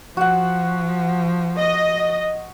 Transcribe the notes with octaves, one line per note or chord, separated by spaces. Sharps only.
F3 F#4 F#5
D#5